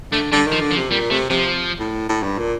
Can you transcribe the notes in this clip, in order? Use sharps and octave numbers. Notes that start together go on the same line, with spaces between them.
D3 A3
D3 G3
D#3
F3
D3
F3
C3
A#2 G3
C3 A3
C3 F3
A2
A2
G2
A#2